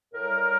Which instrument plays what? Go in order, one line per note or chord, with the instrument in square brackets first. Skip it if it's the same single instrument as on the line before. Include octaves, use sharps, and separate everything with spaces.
[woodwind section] A2 G3 A#4